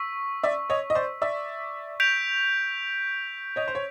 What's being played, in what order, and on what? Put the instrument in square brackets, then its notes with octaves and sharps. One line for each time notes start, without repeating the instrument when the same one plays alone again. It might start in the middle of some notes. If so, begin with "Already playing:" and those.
Already playing: [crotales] C#6 E6 B6
[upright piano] D5 E5
C#5 D#5
D#5
C5 D5
D5 E5
[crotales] G6 B6 D7 F7
[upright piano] C#5 D#5
C5
C#5